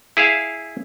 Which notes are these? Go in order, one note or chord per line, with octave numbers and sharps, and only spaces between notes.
E4 G#4 E5 F5